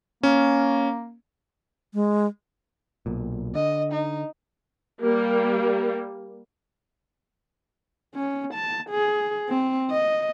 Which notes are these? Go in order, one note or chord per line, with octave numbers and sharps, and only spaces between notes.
A#3 C#4
G#3
B1 A#2
D3 D#5
D#4
G3 A#3
C#4
A5
G#4
C4
D#5